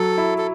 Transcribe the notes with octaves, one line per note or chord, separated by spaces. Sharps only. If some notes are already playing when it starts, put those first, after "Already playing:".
Already playing: F#3 A4
E4
A4